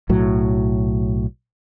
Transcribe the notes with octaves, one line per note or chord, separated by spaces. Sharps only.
B1 A2 F#3